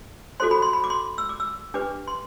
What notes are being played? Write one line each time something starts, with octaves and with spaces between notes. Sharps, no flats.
F#4 A4 C5 C6
B5
C6
B5
D6
C6
E6
D6
E6
D4 G4 B4 D6
C6